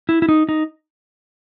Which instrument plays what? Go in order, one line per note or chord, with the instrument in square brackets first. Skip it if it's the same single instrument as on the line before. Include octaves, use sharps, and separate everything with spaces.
[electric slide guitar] E4
E4
D#4
D#4